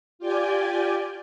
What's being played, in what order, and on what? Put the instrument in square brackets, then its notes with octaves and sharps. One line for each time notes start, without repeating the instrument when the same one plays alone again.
[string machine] F4 G4 D5 G5 G#5